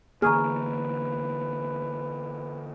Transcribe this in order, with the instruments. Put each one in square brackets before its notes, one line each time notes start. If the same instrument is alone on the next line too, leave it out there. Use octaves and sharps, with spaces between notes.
[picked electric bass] D3 E3 A#3 [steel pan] G#4 [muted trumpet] B4 [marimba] A#5 C#6 F6